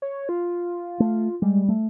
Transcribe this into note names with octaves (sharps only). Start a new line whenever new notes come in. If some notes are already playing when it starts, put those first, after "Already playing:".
C#5
F4
A3
G3 G#3
A3